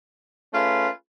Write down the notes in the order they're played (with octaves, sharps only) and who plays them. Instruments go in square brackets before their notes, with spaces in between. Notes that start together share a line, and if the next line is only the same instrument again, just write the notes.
[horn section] A3 C#4 F4 G#4 B4